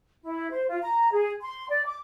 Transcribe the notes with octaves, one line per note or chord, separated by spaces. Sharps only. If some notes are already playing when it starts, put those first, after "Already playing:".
E4
C5
F4
A#5
G#4
C6
D5
D6